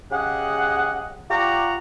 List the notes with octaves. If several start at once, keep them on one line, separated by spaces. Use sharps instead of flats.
C#3 G4 G#4 D#5 F#5
F4 G4 D5 F#5 A#5 C#6